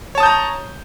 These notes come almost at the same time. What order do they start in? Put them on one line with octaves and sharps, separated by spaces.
C#5 A5 D#6 G6 A#5